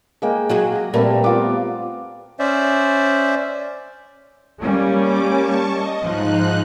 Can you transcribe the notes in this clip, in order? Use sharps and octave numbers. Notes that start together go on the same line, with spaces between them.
G#3 A#3 G5
F#3 F#4 G#4 G5
A#5
A#2 G3 A3 C4 A#4 B4
B3 F4 D6
C#4 C5 D5 E5
G3 A#3 C#4
D6
A5 C#6
D#5
G#2 F3 D#4 F#6